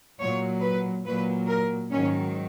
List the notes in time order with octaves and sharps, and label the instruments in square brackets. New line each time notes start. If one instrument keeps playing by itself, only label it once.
[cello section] A#2 F#3 C#5
B4
A#2 F#3 B4
A#4
G#2 D#3 F#3 C#4